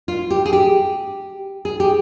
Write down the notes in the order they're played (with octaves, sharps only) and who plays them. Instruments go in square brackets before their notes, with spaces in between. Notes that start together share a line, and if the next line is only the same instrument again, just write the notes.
[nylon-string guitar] F4
G4
G#4
G4
G#4
G4